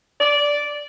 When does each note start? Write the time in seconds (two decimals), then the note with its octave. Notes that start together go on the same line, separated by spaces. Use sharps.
0.21 D5